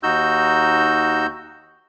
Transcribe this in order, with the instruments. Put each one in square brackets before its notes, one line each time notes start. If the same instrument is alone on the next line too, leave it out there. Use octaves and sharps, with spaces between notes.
[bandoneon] D#2 D#4 F#4 E6 G6